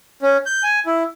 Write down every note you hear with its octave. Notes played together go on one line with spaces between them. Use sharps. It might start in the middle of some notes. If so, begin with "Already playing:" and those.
C#4
G6
G#5
E4